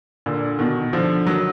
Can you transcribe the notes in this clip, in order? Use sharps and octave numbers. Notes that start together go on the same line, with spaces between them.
A#2 D3
B2 D#3
D3 F3
D#3 F#3